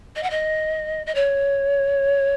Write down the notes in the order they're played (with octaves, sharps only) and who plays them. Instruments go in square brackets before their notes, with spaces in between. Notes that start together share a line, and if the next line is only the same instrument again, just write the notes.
[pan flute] D#5
F#5
D#5
D#5
C#5